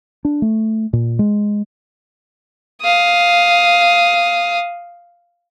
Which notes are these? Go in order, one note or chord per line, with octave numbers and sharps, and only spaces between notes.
D4
A3
A#2
G#3
F5 D#6